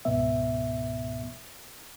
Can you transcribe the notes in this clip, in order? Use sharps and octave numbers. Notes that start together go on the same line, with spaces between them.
C#2 G#2 B2 B3 E5